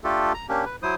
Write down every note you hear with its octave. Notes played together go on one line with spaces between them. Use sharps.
A3 D4 F4 G4 A4
A#5
A#3 C#4 D4 G4
B4
F#3 E4 C5 D#6